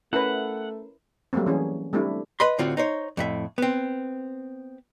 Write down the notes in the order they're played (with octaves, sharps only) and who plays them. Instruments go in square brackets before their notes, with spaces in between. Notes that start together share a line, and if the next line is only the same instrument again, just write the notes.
[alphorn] A3 [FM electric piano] C#4 A#4 [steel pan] E4 B4 [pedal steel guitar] F#5
[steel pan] F#3 G3 A3 A#3 C4
E3 C#4 G#4
G3 A3 C4 D4 E4
[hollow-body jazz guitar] B4 D#5 B5 C6
A2 D3 C4 F4 F#4
D#4 C5 C#5
F2 A2 E5
B3 C4